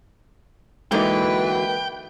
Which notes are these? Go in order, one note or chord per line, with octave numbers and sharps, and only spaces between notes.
D3 E3 F#3 G#3 A#3 D#4 B4 G5